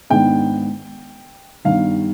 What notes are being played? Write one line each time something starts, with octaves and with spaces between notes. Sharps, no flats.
G#2 D#3 B3 D4 G5
G2 D#3 B3 D4 F5